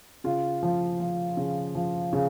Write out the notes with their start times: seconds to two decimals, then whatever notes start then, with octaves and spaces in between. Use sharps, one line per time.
0.24 C#3 F4
0.63 F3
1.00 F3
1.37 C#3
1.75 F3
2.13 C#3